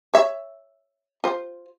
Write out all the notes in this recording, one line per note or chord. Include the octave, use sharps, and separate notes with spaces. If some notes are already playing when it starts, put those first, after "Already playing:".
C#5 E5
F4 C5